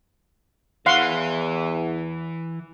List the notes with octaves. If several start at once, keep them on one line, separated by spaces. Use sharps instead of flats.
E2 E3 F5 F#5 C6